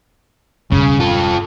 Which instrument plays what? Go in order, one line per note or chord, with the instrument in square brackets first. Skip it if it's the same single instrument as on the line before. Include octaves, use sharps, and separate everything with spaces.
[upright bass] E1 G2 [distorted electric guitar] C#3
[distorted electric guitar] F4 A4